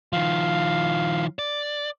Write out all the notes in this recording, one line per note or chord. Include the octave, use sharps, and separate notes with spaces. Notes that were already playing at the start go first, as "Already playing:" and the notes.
D#3 F3 F5
D5